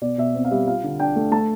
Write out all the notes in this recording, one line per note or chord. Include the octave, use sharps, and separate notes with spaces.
B2 D5
B2 E5
C4
F5
G3 E5
F4 F5
D3
D4 G5
A3
A3 A5